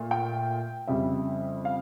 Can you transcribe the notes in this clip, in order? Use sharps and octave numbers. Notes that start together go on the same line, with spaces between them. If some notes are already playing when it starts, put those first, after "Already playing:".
Already playing: A#2 A3
G5
F2 C#3 G3 E5
F5